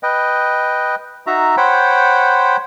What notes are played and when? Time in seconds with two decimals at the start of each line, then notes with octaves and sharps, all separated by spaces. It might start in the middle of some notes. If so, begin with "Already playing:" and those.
0.03 B4 D#5 G5
1.27 D#4 F#4 E5 A#5
1.57 C5 C#5 F#5 G5 B5